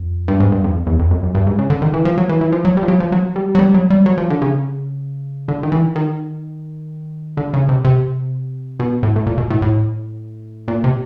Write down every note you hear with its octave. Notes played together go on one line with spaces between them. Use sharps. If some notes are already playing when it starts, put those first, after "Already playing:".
Already playing: F2
G2
G#2
G2
F2
E2
F2
F#2
F#2
G2
G#2
C#3
D3
D#3
E3
F3
F#3
E3
E3
F3
F#3
G3
F3
F#3
F3
F#3
G3
F#3
G3
F#3
G3
F#3
F3
D3
C#3
D3
D#3
E3
D#3
D3
C#3
C3
C3
B2
A2
A2
A#2
B2
A2
A2
A#2
C3